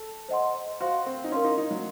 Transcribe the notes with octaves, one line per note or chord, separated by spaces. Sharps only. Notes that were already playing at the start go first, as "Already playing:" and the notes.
Already playing: A4
C5 D#5 F#5 C6
F#4 C5 F5 C6
C4
D#4
C#4 A#4 F5 C6
D#4
D#4
F#3